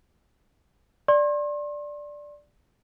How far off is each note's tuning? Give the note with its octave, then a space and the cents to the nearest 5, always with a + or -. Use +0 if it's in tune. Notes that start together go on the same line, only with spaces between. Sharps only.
D5 +0 C6 +40